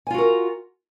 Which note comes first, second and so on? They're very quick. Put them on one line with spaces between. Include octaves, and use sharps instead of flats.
G#5 F4 F#4 A#4